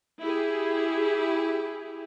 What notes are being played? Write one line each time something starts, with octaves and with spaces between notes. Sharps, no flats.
E4 G4 G#4